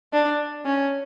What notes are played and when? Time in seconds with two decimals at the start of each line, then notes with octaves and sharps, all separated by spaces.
0.13 D4
0.66 C#4